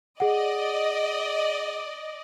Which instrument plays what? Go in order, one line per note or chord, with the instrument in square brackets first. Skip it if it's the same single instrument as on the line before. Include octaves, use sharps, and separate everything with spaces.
[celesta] G#4 F#5 [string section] D5 D#5